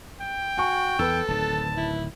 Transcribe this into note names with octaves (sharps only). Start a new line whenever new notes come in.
G5
F#4 G#5 C#6
E2 A4 B4 E6
D1 D#3 A5
E4